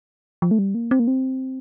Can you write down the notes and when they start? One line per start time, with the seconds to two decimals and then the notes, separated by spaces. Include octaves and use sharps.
0.42 F3
0.51 A3
0.59 G3
0.75 A#3
0.91 C4
0.99 A#3
1.08 C4